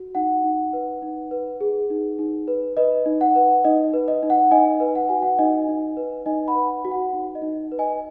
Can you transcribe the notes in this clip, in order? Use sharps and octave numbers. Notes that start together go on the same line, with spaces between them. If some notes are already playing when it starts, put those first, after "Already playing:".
Already playing: F#4
D#4 F#5
D#4
B4
D#4
B4
G#4
D#4
D#4
B4
B4 D#5
D#4
F#5
B4
D#4 D#5
B4
D#5
D#4
F#5
D#4 D#5 G#5
B4
F#5
F#4 G#5
F#5
D#4 D#5 G#5
D#4
B4
D#4 D#5 G#5
F#5 B5
B4
F#4
F#5
D#4
D#5
D#4
B4
D#5 G#5